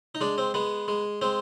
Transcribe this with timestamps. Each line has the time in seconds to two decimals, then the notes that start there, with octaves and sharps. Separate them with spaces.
0.15 D#4
0.21 G#3 D4
0.38 C4
0.54 G#3 B3
0.88 G#3
1.22 G#3 C4